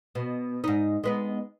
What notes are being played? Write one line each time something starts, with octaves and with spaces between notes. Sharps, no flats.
B2
G#2 D#4
G#3 B3 D#4